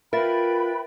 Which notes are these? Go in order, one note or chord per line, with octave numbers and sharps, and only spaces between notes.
F4 A#4 B4 E5 G5 B5 A6